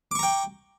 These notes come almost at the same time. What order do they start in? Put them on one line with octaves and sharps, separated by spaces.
D6 C#6 A#5 G5